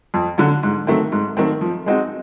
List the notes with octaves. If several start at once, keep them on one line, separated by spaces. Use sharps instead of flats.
F2
D3 F#3
G#2
D#3 F#3 A3 C4
G#2
D#3 F#3 A3 C4
F3
G#3 C4 D#4 F#4